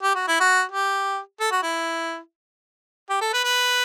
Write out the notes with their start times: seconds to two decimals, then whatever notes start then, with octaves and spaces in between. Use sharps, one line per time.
0.03 G4
0.15 F#4
0.28 E4
0.40 F#4
0.71 G4
1.40 A4
1.52 F#4
1.63 E4
3.10 G4
3.21 A4
3.33 B4
3.44 B4